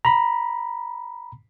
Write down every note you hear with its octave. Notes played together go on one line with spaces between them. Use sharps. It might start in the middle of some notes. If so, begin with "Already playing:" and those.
A#5 B5